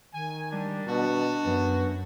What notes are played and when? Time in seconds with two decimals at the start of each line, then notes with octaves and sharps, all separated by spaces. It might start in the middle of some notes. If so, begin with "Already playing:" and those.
0.14 D#3 G#5
0.51 G3 D4
0.87 B2 D4 F#4 A5
1.44 F#2 B3